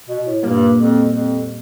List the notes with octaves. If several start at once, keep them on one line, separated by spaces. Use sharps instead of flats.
B2
A2
G2 A#2 G3 A#3
F2
F2